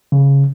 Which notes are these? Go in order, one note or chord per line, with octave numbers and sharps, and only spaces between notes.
C#3